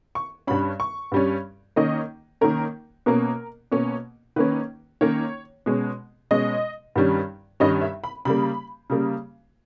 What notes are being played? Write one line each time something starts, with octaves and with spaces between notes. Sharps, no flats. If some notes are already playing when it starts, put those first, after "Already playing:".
C#6
G2 G3 C#4 B5
C#6
G2 G3 C#4
D#3 A#3 C#4 D#5
D#3 A#3 C#4 A#4
B2 A#3 C#4 A#4
B2 A#3 C#4
D#3 A#3 C#4 B4
D#3 A#3 C#4 C#5
B2 G#3 C#4
B2 G#3 C#4 D#5
G2 D#3 G3 C#4
G2 D#3 G3 C#4 D#5
E5
B5
C#3 G3 A#3 B5
C#3 G3 A#3